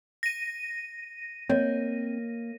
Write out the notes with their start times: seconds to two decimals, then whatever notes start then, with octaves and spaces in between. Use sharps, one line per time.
0.23 A#6 D#7
1.49 A#3 C4 C#5 D#5